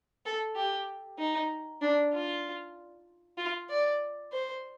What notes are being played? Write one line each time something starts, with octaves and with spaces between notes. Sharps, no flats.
A4
G4
D#4
D4
F4
F4
D5
C5